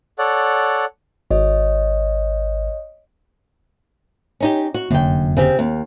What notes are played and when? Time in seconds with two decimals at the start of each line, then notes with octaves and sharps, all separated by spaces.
0.19 A4 C#5 D5 F#5
1.31 G#1 C#5 D#5
4.40 C#4 D#4 G4
4.74 F#4
4.91 F1 F#2 D3 A#3 G5
5.37 C#3 C4 G4
5.59 D#2